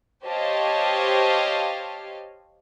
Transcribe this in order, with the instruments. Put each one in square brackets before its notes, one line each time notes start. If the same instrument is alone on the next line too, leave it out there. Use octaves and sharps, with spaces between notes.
[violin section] G4 C5 C#5 D#5 F5 A5